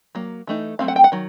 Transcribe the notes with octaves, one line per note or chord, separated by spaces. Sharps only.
F#3 A#3
E3 A3 D#4
F#3 A3 C4 F5
F#5
G5
F#5
D#3 F#3